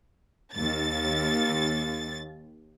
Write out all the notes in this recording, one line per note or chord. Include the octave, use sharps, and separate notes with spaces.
D#2 A6